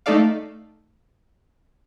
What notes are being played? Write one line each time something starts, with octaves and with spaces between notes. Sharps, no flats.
A3 D#4 A4 D5 F5